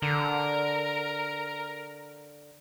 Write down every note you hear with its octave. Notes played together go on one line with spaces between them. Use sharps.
D3 A#4